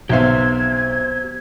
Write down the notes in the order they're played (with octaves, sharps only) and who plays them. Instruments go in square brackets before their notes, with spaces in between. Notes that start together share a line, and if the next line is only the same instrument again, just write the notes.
[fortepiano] B1 E5 F5 [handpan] F#3 B3 [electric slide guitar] G4 C5 [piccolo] G#6